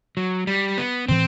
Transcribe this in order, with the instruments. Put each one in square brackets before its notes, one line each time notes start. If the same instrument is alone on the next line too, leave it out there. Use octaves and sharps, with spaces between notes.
[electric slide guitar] F#3
G3
B3
[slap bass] A2 E3 [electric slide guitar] C4